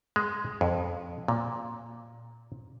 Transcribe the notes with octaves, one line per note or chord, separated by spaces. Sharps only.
G#3
F2
A#2